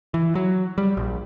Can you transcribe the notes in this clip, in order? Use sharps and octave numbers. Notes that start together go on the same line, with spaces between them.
E3
F#3
G3
A#1